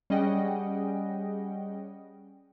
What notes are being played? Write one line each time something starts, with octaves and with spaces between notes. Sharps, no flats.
G3 C#4 G#4 D#5 F#5 G5